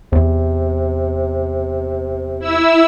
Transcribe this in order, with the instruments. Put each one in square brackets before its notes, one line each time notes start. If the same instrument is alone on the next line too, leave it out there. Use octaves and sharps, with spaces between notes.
[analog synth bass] E2 [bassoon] C3
[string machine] E4 E6